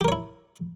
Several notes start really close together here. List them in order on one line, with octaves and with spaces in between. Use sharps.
G4 A#4 C#5 E4